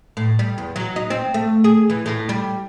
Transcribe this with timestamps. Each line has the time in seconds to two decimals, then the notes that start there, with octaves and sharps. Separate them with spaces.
0.17 A2
0.39 G3
0.58 E2
0.76 F#3
0.96 D#4
1.10 C4
1.34 A3
1.64 G#4
1.90 E3
2.06 A2
2.29 G3